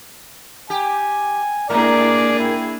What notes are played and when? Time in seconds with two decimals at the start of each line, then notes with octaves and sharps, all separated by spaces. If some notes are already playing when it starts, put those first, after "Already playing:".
0.70 G4 G#5
1.70 G#2 A#3 D4 E4 G#4 A#4 D5
2.40 E4 G5